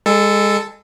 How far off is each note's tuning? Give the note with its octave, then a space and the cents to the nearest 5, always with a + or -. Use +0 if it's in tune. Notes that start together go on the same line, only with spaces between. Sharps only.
G#3 -25 A4 +0